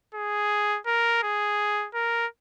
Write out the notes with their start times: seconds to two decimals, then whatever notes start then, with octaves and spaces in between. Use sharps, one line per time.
0.15 G#4
0.87 A#4
1.23 G#4
1.94 A#4